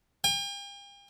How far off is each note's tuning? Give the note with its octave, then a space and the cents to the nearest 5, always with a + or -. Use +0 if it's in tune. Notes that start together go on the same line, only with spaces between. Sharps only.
G5 +45